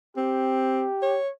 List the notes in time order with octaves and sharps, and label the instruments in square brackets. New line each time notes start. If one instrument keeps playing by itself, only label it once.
[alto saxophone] C4 [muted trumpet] G4
[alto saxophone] C#5